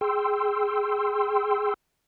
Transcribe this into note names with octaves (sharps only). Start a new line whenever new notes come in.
G#4 G5 C6 E6